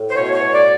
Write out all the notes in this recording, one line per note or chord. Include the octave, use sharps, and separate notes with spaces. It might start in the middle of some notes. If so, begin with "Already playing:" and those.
Already playing: A2
C5
B2 C#5
C#5
B2
D5